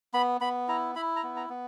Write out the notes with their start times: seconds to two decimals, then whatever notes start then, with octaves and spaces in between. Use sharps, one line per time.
0.14 B3 B5
0.41 B3 B5
0.68 E4 A#5
0.95 E4 B5
1.16 A#5
1.23 B3
1.37 A#5
1.49 B3